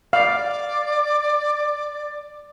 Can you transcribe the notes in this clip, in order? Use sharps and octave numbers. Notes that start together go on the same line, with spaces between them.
D5 F5